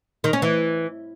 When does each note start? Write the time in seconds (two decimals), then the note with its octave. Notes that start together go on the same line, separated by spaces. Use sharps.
0.24 D#3
0.33 C#4
0.42 E3